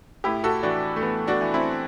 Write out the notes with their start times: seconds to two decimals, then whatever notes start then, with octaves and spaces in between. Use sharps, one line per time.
0.24 A2 E4 G4
0.44 F#4 A4
0.63 E3 D4 F#4
0.96 A3
1.02 E3 B3
1.27 D4 F#4
1.41 E3
1.54 C4 E4